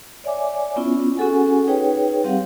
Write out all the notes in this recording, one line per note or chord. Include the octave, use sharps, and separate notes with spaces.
C#5 D5 E5 G#5 D6
B3 C#4 E4 F4
C#4 F#4 G#4 A4 F#5 G#5
D#4 G#4 B4 C#5 G5
G3 C4 G4 F5 F#5